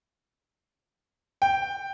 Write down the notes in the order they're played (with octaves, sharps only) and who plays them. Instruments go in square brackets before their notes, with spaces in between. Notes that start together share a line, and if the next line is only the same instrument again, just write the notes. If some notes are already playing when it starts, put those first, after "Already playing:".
[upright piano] G5